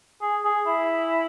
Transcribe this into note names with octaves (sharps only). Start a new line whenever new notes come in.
G#4
G#4
E4